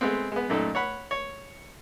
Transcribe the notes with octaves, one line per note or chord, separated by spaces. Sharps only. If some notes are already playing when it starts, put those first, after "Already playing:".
G#3 A3 B3 C4
G#3 B3
F#2 A#2 A3 D#4 A4
C#5 F#5 B5
C#5